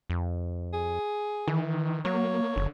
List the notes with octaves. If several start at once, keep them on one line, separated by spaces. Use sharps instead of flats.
F2
G#4
D#3 E3
F#3 A#3 C#5
F#1 D3